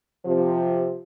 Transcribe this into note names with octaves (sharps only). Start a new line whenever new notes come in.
C3 F3